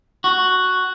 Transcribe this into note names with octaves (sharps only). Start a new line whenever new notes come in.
F#4